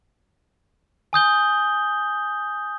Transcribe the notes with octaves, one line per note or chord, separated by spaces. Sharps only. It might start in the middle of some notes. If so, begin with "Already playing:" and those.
G#5 D#6 G6 G7